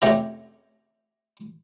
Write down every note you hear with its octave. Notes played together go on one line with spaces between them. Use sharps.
F2 C3 A3 C#4 G4 A#5